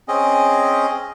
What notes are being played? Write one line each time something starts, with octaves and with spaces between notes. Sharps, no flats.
C4 C#4 G#4 D#5